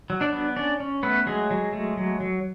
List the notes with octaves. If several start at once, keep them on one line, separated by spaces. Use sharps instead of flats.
F#3
D4 D5
B3
C#4 D4 D5
C#4
A3 B3 B4
F#3 G#3 G#4
F#3
A3
F#3
F#3